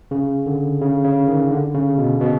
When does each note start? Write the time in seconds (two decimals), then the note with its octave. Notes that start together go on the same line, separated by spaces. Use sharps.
0.11 C#3
0.46 D3
0.81 C#3
1.05 C#3
1.27 D#3
1.51 D3
1.75 C#3
1.98 B2
2.20 B2